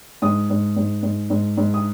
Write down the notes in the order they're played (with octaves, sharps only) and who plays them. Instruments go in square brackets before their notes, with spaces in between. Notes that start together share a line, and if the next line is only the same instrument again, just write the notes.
[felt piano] G#2 D#6
G#2
G#2
G#2
G#2
G#2
D#6